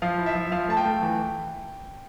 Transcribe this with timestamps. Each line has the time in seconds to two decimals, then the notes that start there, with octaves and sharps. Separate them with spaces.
0.02 F3 F5
0.18 E4
0.26 E5
0.35 F3
0.52 F3 F5
0.69 A3 A5
0.77 G5
0.85 A3
1.02 E3